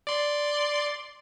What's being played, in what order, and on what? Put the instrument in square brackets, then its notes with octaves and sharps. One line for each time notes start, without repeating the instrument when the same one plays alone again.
[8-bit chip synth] D5 C6